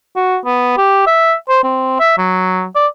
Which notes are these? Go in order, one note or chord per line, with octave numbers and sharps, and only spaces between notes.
F#4
B3
G4
E5
C5
C4
E5
F#3
D5